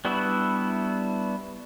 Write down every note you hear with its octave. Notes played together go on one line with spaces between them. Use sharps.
G3 B3 D4 E4 F#4